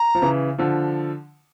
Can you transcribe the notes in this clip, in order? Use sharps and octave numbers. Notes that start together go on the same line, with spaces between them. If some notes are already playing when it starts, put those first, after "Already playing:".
Already playing: A#5
F3
C#3 E3
D3 F3